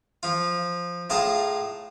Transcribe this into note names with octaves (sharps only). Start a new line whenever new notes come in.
F3 F4
A2 F4 G#4 A5 A#5